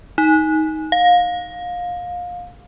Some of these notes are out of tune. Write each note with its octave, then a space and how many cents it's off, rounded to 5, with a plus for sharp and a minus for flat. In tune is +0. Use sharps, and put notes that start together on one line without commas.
D#4 +15
F5 +25